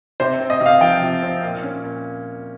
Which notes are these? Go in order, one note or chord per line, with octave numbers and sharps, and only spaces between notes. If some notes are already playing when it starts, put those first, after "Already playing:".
C3 C5
C4
D#5
C3
F5
F3 G5
C3
C4
A#2
C#4
A#2